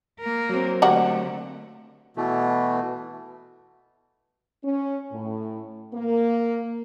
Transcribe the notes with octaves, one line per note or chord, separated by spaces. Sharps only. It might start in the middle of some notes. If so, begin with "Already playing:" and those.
A#3 A#4
F#3 C4
D3 G3 A3 A#3 F#4
B2 E3 A3
C#4
A2
A#3